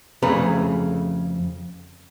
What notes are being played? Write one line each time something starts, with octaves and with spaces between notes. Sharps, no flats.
F2 C#3 A3 G#4 B4 A#5